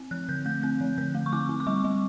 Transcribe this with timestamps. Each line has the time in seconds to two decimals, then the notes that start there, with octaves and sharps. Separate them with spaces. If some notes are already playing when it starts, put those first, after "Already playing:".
Already playing: C4
0.11 F3 F#6
0.29 D3 G6
0.46 A3 G6
0.63 C4 G6
0.81 F3
0.98 D3 G6
1.15 A3
1.26 C#6
1.32 C4 D6
1.49 C4
1.60 D6
1.67 G3 C#6
1.84 G3